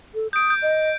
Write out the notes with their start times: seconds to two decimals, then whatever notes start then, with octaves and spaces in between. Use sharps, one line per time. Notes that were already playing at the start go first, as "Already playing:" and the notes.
0.14 A4
0.33 D#6 G6 D7
0.50 G6
0.62 D#5